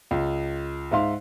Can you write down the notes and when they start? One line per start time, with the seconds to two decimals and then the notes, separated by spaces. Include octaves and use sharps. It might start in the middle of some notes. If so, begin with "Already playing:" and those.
0.11 C#2
0.91 G#2 E5 F5 C6